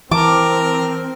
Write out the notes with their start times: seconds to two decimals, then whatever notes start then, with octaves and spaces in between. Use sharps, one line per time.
0.11 E3 C4 A#4 A5 D6